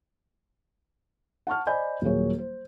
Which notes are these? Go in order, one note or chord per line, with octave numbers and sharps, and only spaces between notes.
F#5 A5 C#6 F6
C5 D5 D#5 G#5 B5 G6
D#1 F#3 A#3 G#4 C#5
C5